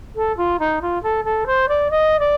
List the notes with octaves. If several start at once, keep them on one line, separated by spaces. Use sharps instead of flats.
A4
F4
D#4
F4
A4
A4
C5
D5
D#5
D5